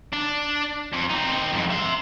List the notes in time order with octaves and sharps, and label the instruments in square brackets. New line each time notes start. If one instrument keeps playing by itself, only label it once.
[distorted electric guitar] D4
F2
C4 D#4
F2 G#2
E5 C6